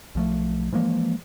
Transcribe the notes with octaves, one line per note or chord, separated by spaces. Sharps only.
B1 F3 A3
E3 F3 G#3 A#3